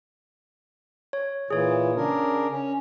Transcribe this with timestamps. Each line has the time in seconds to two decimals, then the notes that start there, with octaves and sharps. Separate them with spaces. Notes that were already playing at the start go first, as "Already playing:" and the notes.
1.13 C#5
1.50 A#2 E3 G#4 C#5
1.96 C#3 D4 A#4
2.50 C#4